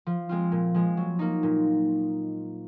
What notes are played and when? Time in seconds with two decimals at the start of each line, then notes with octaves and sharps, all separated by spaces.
0.06 F3
0.29 G#3 C4 F4
0.52 A#2
0.74 F3 G#3
0.97 F#3
1.19 A#3 D#4
1.43 A#2